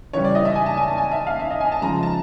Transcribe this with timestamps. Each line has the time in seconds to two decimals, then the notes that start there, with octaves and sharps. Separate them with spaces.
0.13 C#3 E3 G3 C#5
0.24 D5
0.35 D#5
0.45 E5
0.55 G#5
0.66 A5
0.77 G#5
0.88 A5
0.98 G#5
1.12 E5
1.27 F5
1.40 E5
1.50 D#5
1.61 G#5
1.72 A5
1.82 C#3 F3 G#3 A#5
2.03 A5